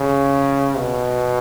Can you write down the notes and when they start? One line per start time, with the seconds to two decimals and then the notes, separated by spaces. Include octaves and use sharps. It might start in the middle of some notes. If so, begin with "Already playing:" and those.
Already playing: C#3
0.77 B2